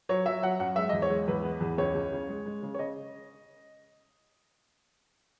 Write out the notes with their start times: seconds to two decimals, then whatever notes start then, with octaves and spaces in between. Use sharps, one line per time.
0.09 F#3 C#5
0.26 F#3 E5
0.43 F#3 F#5
0.59 F#2 F#5
0.76 G#3 E5
0.89 E2 D#5
1.02 C#5
1.10 G#3
1.28 E2 B4
1.43 B3
1.61 E2
1.78 C#2 C#5
1.94 C#2
2.11 C#3
2.29 G#3
2.46 G#3
2.63 C#3
2.75 C#5
2.79 C#3 D#5